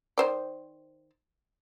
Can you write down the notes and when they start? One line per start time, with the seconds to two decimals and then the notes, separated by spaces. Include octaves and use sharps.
0.18 D#3 C5 D5